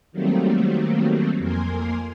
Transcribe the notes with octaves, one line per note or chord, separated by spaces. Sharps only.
D#3 F#3 G3 A3 A#3 C4
F2 A#3 A#4 G#5 C6